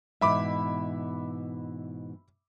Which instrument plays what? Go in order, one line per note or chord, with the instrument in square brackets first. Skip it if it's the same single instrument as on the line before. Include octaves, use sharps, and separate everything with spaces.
[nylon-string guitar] G#2 B2 E3 [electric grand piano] E5 B5 D6